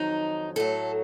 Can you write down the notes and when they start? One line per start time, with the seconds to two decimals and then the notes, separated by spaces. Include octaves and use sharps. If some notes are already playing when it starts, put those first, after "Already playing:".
Already playing: F2 D#3 F#3 D#4
0.56 A2 F#3 A4